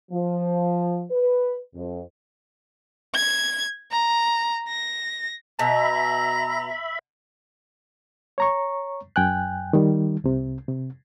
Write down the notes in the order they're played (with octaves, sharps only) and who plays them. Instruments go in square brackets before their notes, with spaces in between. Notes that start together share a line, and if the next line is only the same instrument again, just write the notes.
[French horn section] F3
B4
F2
[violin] G#6
A#5
A#6
[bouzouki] B2 [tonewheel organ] E5 B5 [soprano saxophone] A#5
[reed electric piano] C#5 A#5 C#6
F#2 G5 G#5 F#6
D#3 G3
C2 C3
C3